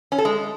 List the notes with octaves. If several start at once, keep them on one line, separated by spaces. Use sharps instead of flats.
C#4
A4
G#3